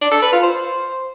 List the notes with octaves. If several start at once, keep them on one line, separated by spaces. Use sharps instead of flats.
D4
A4
B4
F4
C5